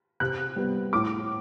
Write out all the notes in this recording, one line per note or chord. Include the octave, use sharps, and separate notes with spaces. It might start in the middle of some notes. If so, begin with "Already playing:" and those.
C3 F#6
G3 B3
A2 D6